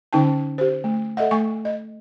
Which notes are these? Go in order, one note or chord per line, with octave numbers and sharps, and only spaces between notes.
D3 C#4 D#4 G5 A5
G4 C5
A3
A4 D#5 E5 F#5
A3 G#5 C#6
D#5